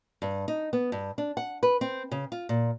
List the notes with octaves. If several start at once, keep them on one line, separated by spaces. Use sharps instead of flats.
G2
D#4
B3
G2
D4
F#5
B4
C4
C#3
F4
A#2